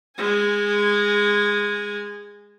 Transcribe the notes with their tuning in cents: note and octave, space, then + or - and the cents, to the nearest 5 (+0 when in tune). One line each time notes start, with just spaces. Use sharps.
G#3 -15 G#5 -5